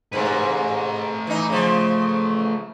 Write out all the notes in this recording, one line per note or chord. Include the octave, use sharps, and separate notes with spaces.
G#2 C3 A3 B4
E3 D#4
C#3 F3